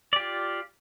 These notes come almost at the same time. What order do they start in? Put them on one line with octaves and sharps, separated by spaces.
D5 G4 F4